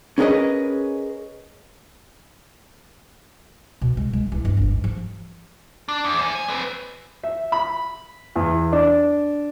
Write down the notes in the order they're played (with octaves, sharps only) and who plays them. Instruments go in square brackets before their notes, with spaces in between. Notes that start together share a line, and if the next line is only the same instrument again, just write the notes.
[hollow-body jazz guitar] C#4 G#4 A#4 B4 D#5
[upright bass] B2
G#3
G#3
E3
G1
F2
G#2
F3
[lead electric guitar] D4
E2
C5 G#5
G#5
C4 B4
[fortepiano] E5
B5
E2
D4